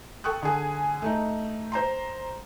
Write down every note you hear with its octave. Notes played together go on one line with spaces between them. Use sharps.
A4 G5 C#6 D#6 F#6
D3 G#4
A3 D#4
C5 A#5 C6